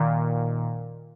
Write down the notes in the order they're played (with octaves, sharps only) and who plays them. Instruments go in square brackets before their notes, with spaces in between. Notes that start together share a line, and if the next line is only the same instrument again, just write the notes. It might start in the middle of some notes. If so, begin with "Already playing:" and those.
Already playing: [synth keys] A#2 D#3